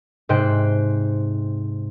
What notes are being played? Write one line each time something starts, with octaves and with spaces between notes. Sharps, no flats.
G#2 C3 C5 G5 F#6